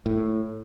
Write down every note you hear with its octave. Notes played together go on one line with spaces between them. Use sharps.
A2